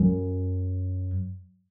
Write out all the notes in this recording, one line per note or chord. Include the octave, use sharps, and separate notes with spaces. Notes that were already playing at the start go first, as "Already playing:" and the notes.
Already playing: F#2